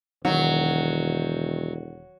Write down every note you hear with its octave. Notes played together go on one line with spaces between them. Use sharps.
E1 D#3 F#3 F#5